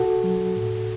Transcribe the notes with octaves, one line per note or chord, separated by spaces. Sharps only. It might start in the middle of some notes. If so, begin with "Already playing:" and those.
Already playing: B2 F#4 A4
F#3
A2